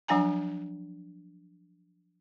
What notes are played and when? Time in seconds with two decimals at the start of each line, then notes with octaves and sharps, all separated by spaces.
0.08 F3 F#3 D4 F#5 G#5 A#5